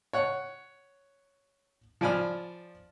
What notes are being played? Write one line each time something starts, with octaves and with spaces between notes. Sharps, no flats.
C#5 F#5
F3 D5 G#5 B5 F6